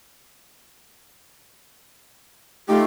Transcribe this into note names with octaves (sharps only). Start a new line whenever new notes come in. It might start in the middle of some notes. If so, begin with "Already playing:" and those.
A3 D#4 F4 G4